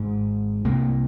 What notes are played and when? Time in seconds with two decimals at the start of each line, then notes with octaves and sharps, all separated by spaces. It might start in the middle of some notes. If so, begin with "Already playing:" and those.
Already playing: G#1 G#2
0.64 C2 C3 A#3